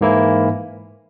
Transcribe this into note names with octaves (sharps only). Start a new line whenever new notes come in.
G#2 E3 A#3 E4